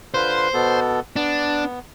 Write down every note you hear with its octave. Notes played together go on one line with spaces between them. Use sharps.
D3 F4 B4 C5
B2 B3 A4
B3 D4